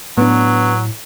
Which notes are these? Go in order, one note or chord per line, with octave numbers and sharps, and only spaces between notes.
A2 F#3 B3 D4